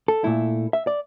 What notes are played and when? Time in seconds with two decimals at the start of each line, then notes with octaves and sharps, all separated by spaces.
0.08 A4
0.24 A#2 A3 E4
0.73 E5
0.87 D5